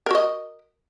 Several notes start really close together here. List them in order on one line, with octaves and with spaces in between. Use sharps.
A#4 F#4 D#5